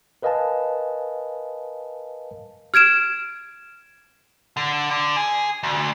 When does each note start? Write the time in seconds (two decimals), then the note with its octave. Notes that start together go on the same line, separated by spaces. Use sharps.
0.22 A#4 B4 D#5 F5 G#5 A5
2.74 F6 G#6 D7 E7
4.57 D3
4.91 D3
5.17 G#4
5.63 D2